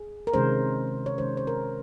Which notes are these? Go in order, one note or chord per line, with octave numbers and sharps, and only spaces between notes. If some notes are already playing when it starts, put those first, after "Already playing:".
Already playing: G#4
A#4
C3 D#3 G#3 C#4 C5
C#5
C3 D#3 G#3 C#4 C5
C5
A#4